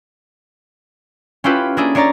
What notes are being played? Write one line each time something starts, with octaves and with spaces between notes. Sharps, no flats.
C#4 E4 F4 G4 A4 B4
A#3 D4 E4 G#4 A4
D4 C#5 D5 A#5 A6